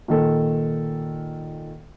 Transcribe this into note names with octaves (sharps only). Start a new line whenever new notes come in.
A#2 D#3 A4